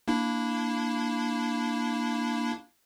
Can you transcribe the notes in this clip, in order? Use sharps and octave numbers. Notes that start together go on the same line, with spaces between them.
A#3 D4 E4